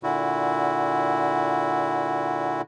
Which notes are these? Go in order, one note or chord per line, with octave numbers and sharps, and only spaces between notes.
A#2 D3 E4 F#4